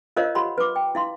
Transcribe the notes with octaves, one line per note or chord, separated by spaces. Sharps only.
F4 A#4 C5 C#5 D#5 F5
G4 F#5 B5 C6
B4 D6
G5
E4 F5 C6